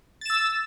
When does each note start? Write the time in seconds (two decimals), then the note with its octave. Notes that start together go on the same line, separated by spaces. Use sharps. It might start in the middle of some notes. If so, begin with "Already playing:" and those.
0.21 A6
0.26 E7
0.30 E6